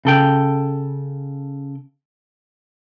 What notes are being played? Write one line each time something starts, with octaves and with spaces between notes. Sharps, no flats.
C#3 A4 G5